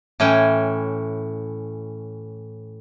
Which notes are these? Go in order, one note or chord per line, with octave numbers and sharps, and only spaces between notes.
A2 E3 C#4 G5 G#5